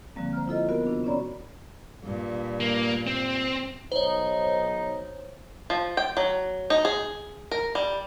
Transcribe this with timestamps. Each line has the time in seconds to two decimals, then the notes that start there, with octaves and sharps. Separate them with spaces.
0.16 D3 F3 G3 A#3 C4
0.33 C5 A#5 F6
0.48 E4 F4 A4 D#5
0.69 B3 F#4 A#4
0.85 C3 D4 F4
1.04 C#4 F#4 C#5 D5 A#5 B5
2.04 G2 A#2
2.60 A#3
3.07 C4
3.92 B1 D#4 C5 C#5
5.70 F3
5.97 G5
6.17 F#3
6.70 D#4
6.85 G#4
7.52 A#4
7.75 G3